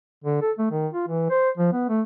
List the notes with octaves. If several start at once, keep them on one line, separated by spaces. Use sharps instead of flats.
D3
A4
A3
D#3
F4
E3
C5
F3
B3
A3